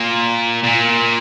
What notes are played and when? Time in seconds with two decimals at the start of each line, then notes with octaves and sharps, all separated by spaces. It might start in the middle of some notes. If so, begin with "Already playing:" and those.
Already playing: A#2
0.63 A#2